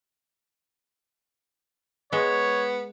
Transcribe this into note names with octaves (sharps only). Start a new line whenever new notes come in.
G#3 B3 C#5